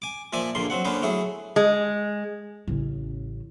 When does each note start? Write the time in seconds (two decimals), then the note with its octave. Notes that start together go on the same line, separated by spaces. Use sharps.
0.02 G#5 D6
0.33 A#2 F3 D5 E5 G#5 A5
0.55 A#1 A#2 D3 A#3 C6
0.70 F#3 C4 F#5
0.85 D3 A#3 B3 C#4 B4 C5
1.02 F#3 A3 E4 G#4
1.56 G#3
2.67 A1 C#3